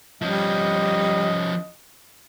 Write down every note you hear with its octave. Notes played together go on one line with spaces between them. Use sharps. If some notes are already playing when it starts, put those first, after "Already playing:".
F3 G3 C#4 D#5